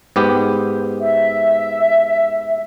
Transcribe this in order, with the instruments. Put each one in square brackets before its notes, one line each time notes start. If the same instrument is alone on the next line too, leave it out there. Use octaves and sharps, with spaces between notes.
[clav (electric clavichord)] G#2 B3 G4
[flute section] E5